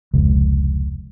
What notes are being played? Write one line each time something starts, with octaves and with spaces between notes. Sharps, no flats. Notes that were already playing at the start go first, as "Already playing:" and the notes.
F1 C#2